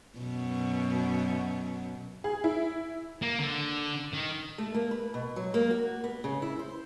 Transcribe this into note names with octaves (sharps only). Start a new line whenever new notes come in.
F#2 B2
G#4
E4
A#3
D3
D#3
A3
A#3
B4
B2
F#3
A#3
F#4
B3
C#3
E4
C5